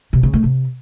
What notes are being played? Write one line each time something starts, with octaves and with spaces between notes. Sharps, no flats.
C3
C#3
A3
C3